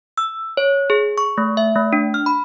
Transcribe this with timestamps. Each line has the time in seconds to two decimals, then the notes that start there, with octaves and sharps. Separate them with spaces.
0.18 E6
0.57 C#5
0.90 G#4
1.18 C#6
1.38 A3
1.57 E5
1.75 A3
1.93 D4
2.14 F6
2.26 B5